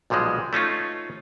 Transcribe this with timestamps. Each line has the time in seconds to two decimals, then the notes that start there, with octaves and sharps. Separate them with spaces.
0.10 B1 A#2 F3 G3 G#3
0.53 A3 C#4 D#4 F4